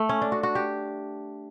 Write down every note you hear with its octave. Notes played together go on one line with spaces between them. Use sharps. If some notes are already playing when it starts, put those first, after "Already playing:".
Already playing: A3
C#4
D4
F#4
F#4
G4